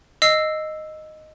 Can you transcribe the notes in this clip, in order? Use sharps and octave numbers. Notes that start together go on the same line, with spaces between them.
D#5 E6 C7